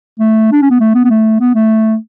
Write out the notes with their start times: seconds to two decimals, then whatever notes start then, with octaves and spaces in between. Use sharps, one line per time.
0.20 A3
0.52 D4
0.62 C#4
0.71 B3
0.80 A3
0.95 B3
1.05 B3
1.10 A3
1.41 B3
1.55 A3